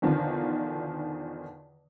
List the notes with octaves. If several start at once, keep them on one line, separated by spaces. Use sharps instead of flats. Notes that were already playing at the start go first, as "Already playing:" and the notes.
E2 B2 D3 D#3 F3